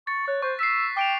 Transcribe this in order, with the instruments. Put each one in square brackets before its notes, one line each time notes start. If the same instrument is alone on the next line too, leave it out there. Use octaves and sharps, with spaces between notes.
[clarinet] C#6 [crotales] A6
[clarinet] C#5 [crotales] F#6
[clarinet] C5 [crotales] C#6
[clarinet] E6 [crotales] B6 C7
[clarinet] G5 [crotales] D6 D7 F7